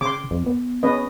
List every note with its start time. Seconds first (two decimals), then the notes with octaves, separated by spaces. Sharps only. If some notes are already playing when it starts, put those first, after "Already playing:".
0.01 C#3 C6 D6
0.31 F2
0.46 B3
0.83 C#4 B4 D#5